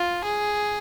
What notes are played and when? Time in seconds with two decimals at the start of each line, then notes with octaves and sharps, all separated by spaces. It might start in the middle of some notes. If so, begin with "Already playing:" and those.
Already playing: F4
0.24 G#4